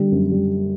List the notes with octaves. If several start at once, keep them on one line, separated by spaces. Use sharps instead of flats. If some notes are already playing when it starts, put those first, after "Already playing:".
Already playing: D3 G3
F#2
G3